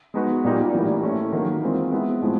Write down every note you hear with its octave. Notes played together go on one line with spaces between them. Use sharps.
G#3 B3 D#4 F#4 B4
A#2 G3 A#3 D#4 G4
A2 E3 G3 A#3
A3 C#4 E4
D#3 F#3 A#3
E3 G#3 C4 F4
G#3 B3 E4
A2 F3 G#3 C4